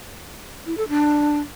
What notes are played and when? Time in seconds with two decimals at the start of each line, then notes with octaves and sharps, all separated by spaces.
0.66 E4
0.77 A4
0.88 D4